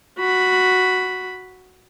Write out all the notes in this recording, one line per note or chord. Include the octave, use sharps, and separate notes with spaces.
F#4 B5